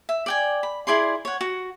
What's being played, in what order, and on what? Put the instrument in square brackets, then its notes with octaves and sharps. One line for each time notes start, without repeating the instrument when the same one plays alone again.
[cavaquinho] E5
D5 G5 G#5
B5
E4 G#4 D5 C6
C#5 F#5
F#4